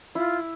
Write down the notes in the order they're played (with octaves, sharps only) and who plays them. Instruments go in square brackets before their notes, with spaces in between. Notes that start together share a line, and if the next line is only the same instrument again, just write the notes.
[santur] E4 [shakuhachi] F4